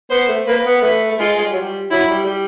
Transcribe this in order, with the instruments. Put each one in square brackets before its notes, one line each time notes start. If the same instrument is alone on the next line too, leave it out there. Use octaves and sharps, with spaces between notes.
[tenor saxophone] B3 [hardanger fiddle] C5
[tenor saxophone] A3
[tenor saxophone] A#3 [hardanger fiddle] B4
[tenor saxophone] B3
[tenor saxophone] A3 [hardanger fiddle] B4
[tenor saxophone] A3
[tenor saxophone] G#3 [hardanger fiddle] F4
[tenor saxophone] G#3
G3
F#3
G3
[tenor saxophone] F#3 [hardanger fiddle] E4
[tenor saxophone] G3
G3